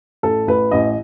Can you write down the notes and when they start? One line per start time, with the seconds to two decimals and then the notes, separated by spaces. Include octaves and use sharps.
0.23 A1 A4
0.47 A1 B4
0.71 A1 D#5